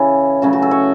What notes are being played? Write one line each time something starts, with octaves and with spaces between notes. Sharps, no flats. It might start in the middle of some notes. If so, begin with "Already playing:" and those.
Already playing: C#3 E3 C#4 E4 A4
C#3 F#3 A3 C#4 F#4
F#4
A4
C#5